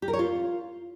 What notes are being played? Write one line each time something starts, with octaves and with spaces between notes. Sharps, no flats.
G4
A#4
C#5
F4